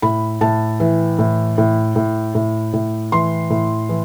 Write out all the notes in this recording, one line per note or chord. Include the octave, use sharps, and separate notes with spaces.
A2 B5
A2 A5
E3
A2
A2
A2
A2
A2
E3 C6
A2
E3